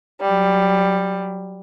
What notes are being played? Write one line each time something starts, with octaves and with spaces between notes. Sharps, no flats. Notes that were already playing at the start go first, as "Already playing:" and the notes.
F#3 G3